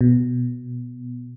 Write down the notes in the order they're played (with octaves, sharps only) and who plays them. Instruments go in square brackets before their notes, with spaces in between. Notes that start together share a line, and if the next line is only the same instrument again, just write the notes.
[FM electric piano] B2